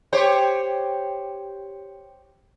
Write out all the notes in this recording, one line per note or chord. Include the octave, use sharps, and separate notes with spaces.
G4 C5 C#5